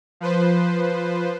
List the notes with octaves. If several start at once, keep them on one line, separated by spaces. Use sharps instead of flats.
F3 B4 C5